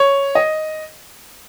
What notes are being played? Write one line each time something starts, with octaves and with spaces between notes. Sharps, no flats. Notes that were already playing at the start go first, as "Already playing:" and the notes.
Already playing: C#5
D#5